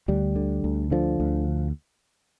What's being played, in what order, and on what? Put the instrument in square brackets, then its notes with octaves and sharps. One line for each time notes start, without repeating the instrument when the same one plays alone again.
[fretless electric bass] D2 G3
D3
D2
D3 F3
D2